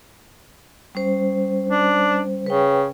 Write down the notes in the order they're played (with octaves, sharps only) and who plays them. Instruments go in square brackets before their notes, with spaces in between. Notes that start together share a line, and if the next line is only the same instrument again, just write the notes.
[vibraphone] G3 C#4 C5
[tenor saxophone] D4
[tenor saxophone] C#3 [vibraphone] B4 G5